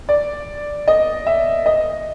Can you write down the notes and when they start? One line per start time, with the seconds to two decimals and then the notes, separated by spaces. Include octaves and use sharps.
0.09 D5
0.88 D#5
1.27 E5
1.66 D#5